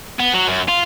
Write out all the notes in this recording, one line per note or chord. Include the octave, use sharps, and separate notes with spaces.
B3
F#3
F#2
F4